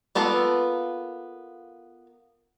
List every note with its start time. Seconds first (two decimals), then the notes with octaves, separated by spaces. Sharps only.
0.15 A#3 B3 F4 A4